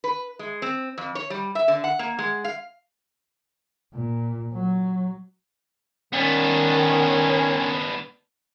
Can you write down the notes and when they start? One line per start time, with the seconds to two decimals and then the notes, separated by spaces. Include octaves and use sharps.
0.04 B4
0.39 G#3
0.62 C4
0.98 F2
1.15 C#5
1.30 G3
1.55 E5
1.68 D3
1.84 F#5
1.99 A#3
2.19 G#3
2.44 F5
3.94 A#2
4.54 F#3
6.13 D#3 B3 C#4 D4